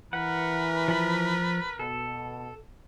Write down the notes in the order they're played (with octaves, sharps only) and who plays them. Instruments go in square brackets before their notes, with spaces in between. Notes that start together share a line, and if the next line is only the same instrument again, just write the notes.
[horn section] E3 [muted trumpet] A#4 [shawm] B4 [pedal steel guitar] F#5
[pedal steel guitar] F3 B5
[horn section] B2 [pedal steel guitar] A4